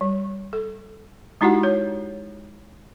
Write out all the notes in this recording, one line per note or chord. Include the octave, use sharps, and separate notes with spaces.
G3
A4
G#3 D#4 E4 F#4 G4 F#5
C#5